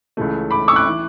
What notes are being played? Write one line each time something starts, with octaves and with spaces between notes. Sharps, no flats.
C#2 C#3 E3 A3
B5 D6
C#6 E6
D6 F#6
E3